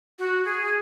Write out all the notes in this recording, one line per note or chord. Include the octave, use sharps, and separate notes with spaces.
F#4
G#4